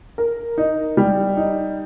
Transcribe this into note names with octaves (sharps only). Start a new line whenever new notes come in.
A#4
D#4
G3
D#4